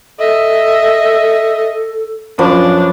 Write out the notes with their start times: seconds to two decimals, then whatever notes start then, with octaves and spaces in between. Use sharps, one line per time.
0.19 A4 D#5 E5
2.39 F#2 F3 D4 B4